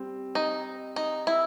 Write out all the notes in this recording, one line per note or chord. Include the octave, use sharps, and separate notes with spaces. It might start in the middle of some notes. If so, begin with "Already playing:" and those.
Already playing: G3 C4
D#4
D#4
E4